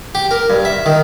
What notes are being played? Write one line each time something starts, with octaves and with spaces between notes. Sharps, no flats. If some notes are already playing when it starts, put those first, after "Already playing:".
G4
A#4
G2
E5
D#3